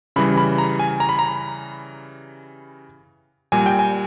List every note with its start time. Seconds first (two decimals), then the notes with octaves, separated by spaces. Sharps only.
0.16 C#3 E3 G3 B5
0.38 B5
0.58 A#5
0.79 G#5
1.00 A#5
1.09 B5
1.19 A#5
3.52 A#2 G3 G#5
3.66 G5
3.79 G#5